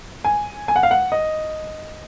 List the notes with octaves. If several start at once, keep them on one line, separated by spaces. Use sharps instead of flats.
G#5
G#5
F#5
F5
F#5
D#5